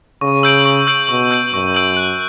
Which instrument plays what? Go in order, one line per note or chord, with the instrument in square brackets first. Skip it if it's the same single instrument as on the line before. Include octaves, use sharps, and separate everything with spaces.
[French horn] C#3 [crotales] C#6
[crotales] E6 G6 D7 F#7
C#6
E6 G6 D7 F#7
[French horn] B2 [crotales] C#6
[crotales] E6 G6 D7 F#7
[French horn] F#2 [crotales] C#6
[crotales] E6 G6 D7 F#7
F#6